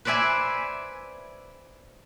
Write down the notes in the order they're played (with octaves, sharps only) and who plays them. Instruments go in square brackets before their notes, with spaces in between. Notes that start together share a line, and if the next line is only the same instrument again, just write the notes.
[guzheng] B4 C5 D5 E5 G#5